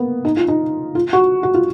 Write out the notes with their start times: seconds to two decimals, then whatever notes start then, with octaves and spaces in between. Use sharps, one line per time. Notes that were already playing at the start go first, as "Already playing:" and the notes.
Already playing: A#3 B3
0.25 D#4
0.37 F4
0.48 D#4
0.95 F4
1.13 F#4
1.43 F#4
1.54 F4